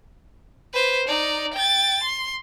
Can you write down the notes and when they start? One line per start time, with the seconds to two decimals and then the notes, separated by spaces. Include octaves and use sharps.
0.73 B4 C5
1.07 D#4 D5
1.54 G5 A6
2.03 C6